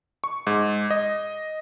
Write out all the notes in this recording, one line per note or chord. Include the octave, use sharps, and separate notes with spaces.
C#6
G#2
D#5